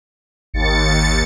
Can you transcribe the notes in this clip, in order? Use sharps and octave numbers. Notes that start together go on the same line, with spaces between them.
G#1 D#2 A6 C#7